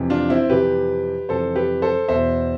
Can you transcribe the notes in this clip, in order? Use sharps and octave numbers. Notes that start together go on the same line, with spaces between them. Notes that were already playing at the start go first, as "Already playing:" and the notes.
Already playing: F2 C3 E3
D4 F4
C4 E4
F2 C3 E3 G4 B4
F2 C3 E3 A4 C5
G4 B4
A4 C5
E2 B2 C5 E5